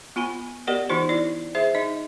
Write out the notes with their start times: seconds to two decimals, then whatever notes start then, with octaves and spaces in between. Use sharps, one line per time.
0.16 B3 F4 G#5 B5
0.67 B3 G4 A#4 D5 D#5 F#5
0.89 E3 B3 D#4 F4 C5
1.09 E4 D5
1.55 G#4 C5 E5
1.75 D#4 D#5